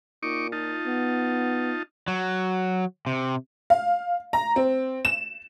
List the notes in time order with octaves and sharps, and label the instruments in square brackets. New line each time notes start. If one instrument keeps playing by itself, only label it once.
[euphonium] A#2 [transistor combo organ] D#4 C#6 D6
[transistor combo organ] D#4 F4 A5
[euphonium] B3
[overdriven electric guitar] F#3
C3
[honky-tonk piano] F5
A#5
C4
E7